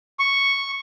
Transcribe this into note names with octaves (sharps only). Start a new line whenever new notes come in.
C#6